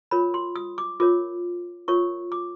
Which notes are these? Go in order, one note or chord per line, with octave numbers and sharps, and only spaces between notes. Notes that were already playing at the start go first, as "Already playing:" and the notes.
F4 A#4 C#5 B5
C6
D#6
D6
F4 A#4 C#5 D6
F4 A#4 C#5 C#6
D6